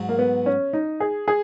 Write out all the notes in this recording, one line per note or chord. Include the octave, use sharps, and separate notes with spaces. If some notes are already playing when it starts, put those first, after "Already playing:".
Already playing: G#2 F#3
A#3
B3
C#4
D#4
G#4
G#4